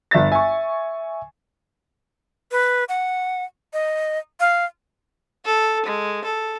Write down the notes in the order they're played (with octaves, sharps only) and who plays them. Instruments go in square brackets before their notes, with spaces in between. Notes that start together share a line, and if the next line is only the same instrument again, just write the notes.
[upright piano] G1 E5 A6
[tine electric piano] E5 [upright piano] G#5 C#6
[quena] B4
F#5
D#5
F5
[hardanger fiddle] A4
G#3
A4